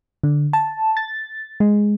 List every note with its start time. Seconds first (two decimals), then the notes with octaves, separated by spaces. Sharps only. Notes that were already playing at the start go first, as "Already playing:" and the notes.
0.24 D3
0.53 A5
0.97 A6
1.60 G#3